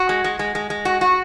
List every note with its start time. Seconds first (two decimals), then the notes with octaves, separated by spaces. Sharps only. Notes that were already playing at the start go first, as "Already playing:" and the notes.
Already playing: F#4
0.09 G#3
0.24 G#3
0.39 G#3
0.55 G#3
0.70 G#3
0.85 F#4
1.01 F#4